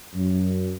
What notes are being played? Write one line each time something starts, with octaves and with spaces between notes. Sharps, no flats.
F#2